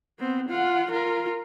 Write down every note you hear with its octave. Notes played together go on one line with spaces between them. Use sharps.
B3 C4
F4 F#5
F4 A#4